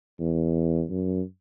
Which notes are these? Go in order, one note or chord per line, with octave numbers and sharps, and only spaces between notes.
E2
F#2